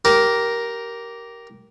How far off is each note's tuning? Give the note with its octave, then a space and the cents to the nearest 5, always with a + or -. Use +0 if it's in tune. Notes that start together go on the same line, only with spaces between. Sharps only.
G4 -15 A#4 +5